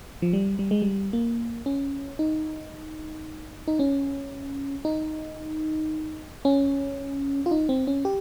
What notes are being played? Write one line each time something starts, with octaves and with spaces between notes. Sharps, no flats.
F3
G3
G3
G#3
G3
A#3
C#4
D#4
D#4
C#4
D#4
C#4
F4
D#4
C4
C#4
G4